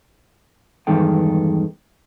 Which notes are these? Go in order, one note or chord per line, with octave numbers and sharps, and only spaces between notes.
E2 G2 D#3 G#3 A4 G5